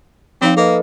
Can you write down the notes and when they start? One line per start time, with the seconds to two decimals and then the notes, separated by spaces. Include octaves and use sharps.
0.42 F3 C4 D#4 F5
0.57 A#3 A4 B4 D#5